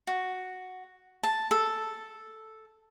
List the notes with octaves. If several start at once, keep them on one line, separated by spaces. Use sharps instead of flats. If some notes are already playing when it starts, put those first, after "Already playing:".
F#4
A5
A4